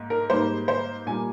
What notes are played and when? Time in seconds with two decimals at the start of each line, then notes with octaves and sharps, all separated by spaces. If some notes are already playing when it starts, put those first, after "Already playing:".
Already playing: G#2 A#3
0.10 A#4
0.30 G#2 G3 A#3 C5
0.68 C5
1.07 A#2 G3 A#3 G#5